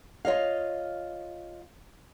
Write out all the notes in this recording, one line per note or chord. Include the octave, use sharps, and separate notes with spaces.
F4 C#5 D#5 F5